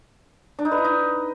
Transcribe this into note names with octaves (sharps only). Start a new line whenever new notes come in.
D4
D#4
B4
E4
D#4